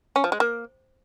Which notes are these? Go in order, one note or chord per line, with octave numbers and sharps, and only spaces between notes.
C#4
F3
G#3
A#3